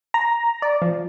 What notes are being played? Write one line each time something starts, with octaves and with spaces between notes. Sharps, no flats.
A#5
D5
F3